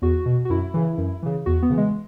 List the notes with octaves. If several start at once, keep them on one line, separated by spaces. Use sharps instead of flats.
E2 F#4
B2
F#4
F#2 E4
C#3 E3
F#2
C#3 E3
E2 F#4
B3
C#3 E3
G#3